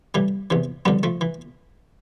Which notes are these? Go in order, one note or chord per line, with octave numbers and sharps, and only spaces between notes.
A2 E3 G3
E2 C3 E3
F2 D3 G3 B3
F3 A3
E3